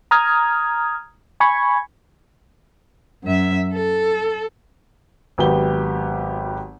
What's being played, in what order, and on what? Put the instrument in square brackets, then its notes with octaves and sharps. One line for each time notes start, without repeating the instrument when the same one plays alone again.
[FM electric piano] A#5 D#6 F6 G#6
G#5 B5 C#6 G#6
[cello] F#2 E5
A4
[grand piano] G#1 F#3 B3 G4 B4 G7